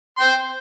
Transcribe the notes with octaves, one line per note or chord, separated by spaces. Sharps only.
C5 G5 C6